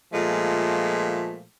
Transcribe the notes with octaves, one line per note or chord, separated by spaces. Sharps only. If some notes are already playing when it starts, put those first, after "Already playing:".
A#2 F3 G#3 A3